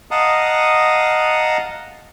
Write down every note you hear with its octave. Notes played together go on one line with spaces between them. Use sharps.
D#5 F5 F#5 A5 A#5 D#6